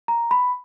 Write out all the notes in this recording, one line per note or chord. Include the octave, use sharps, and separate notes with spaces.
A#5
B5